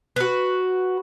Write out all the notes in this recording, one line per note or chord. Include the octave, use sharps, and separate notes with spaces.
F#4 B4